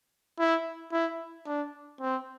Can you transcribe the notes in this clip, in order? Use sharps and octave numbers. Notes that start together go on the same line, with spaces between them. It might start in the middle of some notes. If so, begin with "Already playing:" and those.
E4
E4
D4
C4